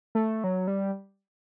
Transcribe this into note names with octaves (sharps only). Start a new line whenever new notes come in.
A3
F#3
G3